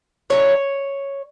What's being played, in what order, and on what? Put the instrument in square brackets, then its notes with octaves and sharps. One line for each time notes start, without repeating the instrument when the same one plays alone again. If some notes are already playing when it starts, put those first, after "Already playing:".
[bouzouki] D3 F#3 C#4 E4 C#5